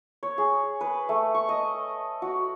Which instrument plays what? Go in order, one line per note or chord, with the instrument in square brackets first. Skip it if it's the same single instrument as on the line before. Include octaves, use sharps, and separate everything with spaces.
[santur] C#5
G#4
B4
A3
C#6
D#5
F#4